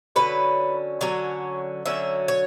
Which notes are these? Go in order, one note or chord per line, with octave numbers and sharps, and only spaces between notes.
D3 F#3 C#4 B4
D3 F#3 C#4 C#5
D3 F#3 C#4 E5
C#5